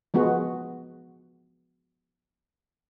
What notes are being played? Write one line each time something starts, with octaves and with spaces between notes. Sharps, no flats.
F3 G#3 B3 F#4